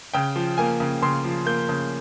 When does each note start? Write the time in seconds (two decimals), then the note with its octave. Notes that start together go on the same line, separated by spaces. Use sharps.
0.14 C#3 G5
0.36 F3
0.58 A#3 G#5
0.80 C#3
1.02 C#3 C6
1.24 F3
1.46 A#3 G6
1.69 C#3